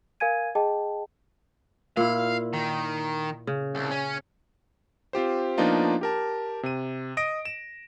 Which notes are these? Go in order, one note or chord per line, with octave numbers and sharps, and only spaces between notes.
A#4 F5 G#5 G#6 D#7
G#4 D#5 G5 A5
A#2 E4 F5
D#3
C#3
C2
C#4
C4 F4 G4 C5
F3 A#3 B3 D4 D#4 F4
G4 A#4 A5
C3 D#7
D#5 D#6 A#6 D7
E7